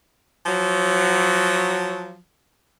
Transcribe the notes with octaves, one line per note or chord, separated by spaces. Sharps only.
F3 F#3